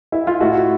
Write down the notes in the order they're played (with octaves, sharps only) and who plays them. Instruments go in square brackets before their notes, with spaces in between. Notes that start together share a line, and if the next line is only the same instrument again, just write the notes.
[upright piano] E4
F4
A2 E4 F#4